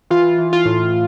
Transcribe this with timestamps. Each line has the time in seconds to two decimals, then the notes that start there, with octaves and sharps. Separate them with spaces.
0.10 E3 F4
0.38 E3
0.53 F4
0.66 A2